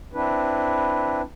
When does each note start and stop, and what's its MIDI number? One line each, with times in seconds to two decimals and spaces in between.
0.14 1.22 60
0.14 1.22 62
0.14 1.22 64
0.14 1.22 71